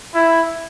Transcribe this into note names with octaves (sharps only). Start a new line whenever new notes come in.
E4